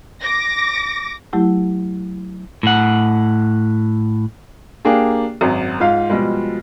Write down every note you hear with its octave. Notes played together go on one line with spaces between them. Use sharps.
D6 A#6
F#3 A3 E4 G4
A2 F#5
A#3 D4 G4 G#4
G#1 F#2
G#2 F4 F5
B2 F3 G3 G#3